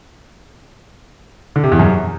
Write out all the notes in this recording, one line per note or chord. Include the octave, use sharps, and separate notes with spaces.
D3
C3
E2
F#2